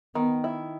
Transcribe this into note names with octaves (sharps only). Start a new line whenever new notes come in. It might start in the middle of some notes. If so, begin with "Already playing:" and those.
D#3 B3
E4